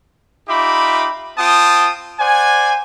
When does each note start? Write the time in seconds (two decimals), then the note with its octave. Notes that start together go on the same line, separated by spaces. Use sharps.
0.48 D#4 F4 G4 E5 B5 D6
1.38 C4 F4 G5 A5 D#6
2.19 C5 D5 F#5 G#5